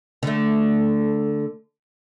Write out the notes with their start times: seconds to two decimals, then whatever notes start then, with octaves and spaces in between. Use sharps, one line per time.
0.23 D3 A3